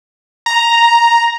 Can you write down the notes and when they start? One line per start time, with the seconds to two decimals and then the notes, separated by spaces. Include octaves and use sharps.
0.46 A#5